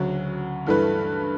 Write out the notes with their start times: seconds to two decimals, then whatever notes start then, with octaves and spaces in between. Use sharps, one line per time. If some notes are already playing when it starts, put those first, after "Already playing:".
Already playing: D2 C#3 F#3 C#4 F#4
0.67 G2 E3 A3 E4 B4